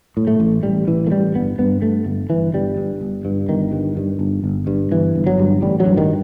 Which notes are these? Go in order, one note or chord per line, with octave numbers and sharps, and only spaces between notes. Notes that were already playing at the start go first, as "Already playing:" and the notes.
A2
A3
A1
A1 G3
A1 E3
A3
A1 G3
G1 B3
G2 B3
G2 A3
G1
G1 E3
G1 G3
G2
G1
G2
G1 D#3
G2
G2
G1
G1
G2
G1 E3
G1
F#3
G2
A1 G3
F#3
G2
D#3